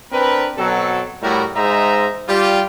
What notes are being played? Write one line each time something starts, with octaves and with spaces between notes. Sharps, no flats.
C4 D4 A#4 B4
B2 F#3 C4 A4
A2 G3 A3 E4 F#4 A#4
G#2 C5 D#5 E5 A#5
G3 F4 G4